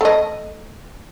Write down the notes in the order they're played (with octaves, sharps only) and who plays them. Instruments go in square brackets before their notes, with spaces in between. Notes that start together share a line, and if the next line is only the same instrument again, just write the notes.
[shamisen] A3 D#5